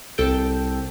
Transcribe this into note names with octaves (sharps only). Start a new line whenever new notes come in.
C2 A4 G5